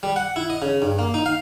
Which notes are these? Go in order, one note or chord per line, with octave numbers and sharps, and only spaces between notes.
G3
F#5
E4
D#5
C#3
G2
A#3
D#4
F5